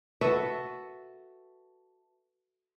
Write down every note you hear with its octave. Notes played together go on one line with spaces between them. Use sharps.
F#4 A4 B4 E5